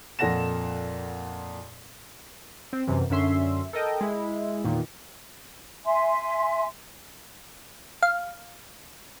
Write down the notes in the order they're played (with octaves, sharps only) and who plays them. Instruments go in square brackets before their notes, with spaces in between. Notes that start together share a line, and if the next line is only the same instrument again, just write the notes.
[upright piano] F2 A#2 A4 F#5 A#6 E7
[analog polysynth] C4
F#2 C3 E3
F#2 D3 C#4 E5 C6
A4 A#4 D#5 G5
G#3 E4
E2 A#2 D#3
[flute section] E5 G#5 C6
[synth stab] F5